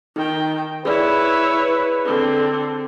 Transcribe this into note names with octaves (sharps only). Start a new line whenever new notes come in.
D#3 D#4 G5
E4 G#4 B4 C#5 D5
D3 C4